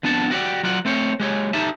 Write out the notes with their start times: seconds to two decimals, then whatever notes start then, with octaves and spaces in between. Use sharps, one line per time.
0.03 F2 B3 D4 F#5 A5
0.31 F#4 G4 C5 D5
0.63 F#3 F4 D5 F#5
0.85 A3 C4 C5 C#5
1.20 G#3 G4 C#5
1.53 D#4 G4 A4 E5 A5